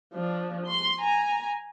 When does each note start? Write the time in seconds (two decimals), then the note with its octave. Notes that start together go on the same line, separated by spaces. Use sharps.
0.14 F3 D4
0.66 C6
1.00 G#5 A#5